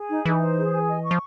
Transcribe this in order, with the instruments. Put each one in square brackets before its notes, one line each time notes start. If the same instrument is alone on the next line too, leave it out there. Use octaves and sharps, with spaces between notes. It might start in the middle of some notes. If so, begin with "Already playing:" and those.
Already playing: [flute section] G#4
D#4
[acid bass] E3 [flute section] D#4
[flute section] C5
G#4
G#5
D#5
C#6
[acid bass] F3